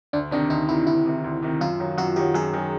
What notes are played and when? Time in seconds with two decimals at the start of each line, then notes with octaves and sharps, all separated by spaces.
0.13 D2 D4
0.31 C3 D#3 D4
0.50 D2 D#4
0.69 C3 D#3 E4
0.87 D2 E4
1.06 C3 D#3
1.24 D2
1.42 C3 D#3
1.61 F#2 F4
1.80 D#3 F#3
1.98 F#2 F#4
2.16 D#3 F#3 G4
2.34 F#2 G#4
2.53 D#3 F#3